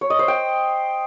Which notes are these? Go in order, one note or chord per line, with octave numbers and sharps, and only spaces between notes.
C#5
D#5
C5
G5